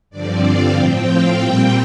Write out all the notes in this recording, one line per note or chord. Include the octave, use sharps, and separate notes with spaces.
G2 D3 F3 C4 D5
F5
A2 F3 C4 G5
F5
A#2 G3 C4 G5